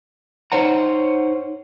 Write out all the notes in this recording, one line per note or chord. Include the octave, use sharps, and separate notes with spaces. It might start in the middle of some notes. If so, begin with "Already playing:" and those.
D#4 C5 C#5 F#5 A#5